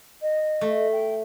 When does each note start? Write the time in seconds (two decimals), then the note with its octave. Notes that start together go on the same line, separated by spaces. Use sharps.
0.21 D#5
0.61 A3
0.92 G5